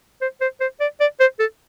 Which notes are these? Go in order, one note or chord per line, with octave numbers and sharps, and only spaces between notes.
C5
C5
C5
D5
D5
C5
A4